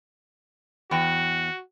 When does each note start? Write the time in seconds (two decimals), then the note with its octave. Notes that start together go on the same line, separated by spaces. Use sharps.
0.91 E2 F#4 G5